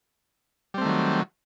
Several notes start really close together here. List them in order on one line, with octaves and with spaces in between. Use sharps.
G3 C4 A3 D#3 F#3